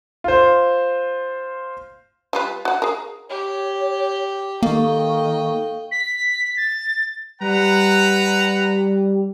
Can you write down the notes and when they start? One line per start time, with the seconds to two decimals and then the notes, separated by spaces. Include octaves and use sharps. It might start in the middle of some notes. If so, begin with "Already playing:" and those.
0.24 F4 C5
2.33 G3 F4 B4
2.65 F#4 F#5
2.82 G#4 A#4
3.30 G4 C#5
4.63 D#3 A#3 A4 D#5 F5 G5 C#6
5.91 B6
6.57 A6
7.41 G3 B4 F#5 A#5